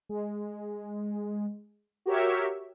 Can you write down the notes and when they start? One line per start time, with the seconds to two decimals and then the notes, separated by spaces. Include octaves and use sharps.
0.09 G#3
2.06 F#4 G4 A#4 C#5 E5